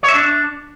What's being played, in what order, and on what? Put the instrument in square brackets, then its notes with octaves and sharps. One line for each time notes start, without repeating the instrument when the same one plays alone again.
[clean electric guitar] C#5
E5
D4